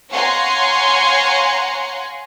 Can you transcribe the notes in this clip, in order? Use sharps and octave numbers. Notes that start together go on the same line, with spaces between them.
C#5 F5 F#5 G#5 A#5 C6